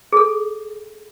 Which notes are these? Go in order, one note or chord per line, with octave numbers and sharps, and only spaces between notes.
G#4 A4